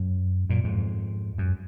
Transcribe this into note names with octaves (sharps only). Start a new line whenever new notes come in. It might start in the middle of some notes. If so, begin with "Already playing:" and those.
Already playing: F#2
F#2 A#2
F2 G#2
F#2